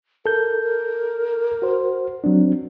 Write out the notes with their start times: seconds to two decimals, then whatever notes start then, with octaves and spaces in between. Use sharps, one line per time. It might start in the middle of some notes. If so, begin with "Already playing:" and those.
0.26 A4 A#4 G6
0.63 A#4
1.62 F#4 C5
2.24 F#3 C4 D4